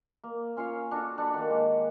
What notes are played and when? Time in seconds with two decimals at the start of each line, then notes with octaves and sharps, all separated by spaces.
0.24 A#3
0.57 C#4 F4 C#5 F5
0.91 D4 F#4 A4
1.18 D4 F#5 B5
1.34 D#3 A#3
1.50 G#3